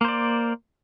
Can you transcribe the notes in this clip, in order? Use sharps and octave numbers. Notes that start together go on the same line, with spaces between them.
A#3 C5 D5